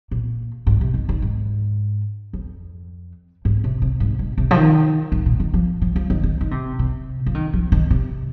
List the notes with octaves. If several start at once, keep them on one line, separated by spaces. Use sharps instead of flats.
A#2
G#2
C3
D#3
D#3
G#2
F2
G#2
C3
C3
G#2
G#2
C3
F3
D#3
G#2
A#2
D#3
F3
F3
F3
D#3
D#3
D#3
C3
C3
F3
D#3
F3
D#3
C3